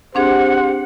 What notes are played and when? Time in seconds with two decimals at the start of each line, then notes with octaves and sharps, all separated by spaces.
0.15 C4 D4 G4 G#4 C5 F#5